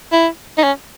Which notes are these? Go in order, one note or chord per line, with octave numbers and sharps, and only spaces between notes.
E4
D#4
C#4